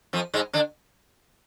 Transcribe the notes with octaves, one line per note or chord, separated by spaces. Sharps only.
F2 F3
G#2 G#3
D3 D4